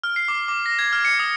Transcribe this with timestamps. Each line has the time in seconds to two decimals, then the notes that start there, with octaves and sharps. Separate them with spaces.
0.04 F6
0.16 C7
0.28 D6
0.48 D6
0.66 A#6
0.79 G#6
0.93 F6
1.05 C#7
1.20 D#6